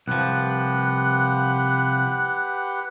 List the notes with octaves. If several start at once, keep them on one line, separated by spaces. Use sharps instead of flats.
C2 F3 G4 B4 F#5 F#6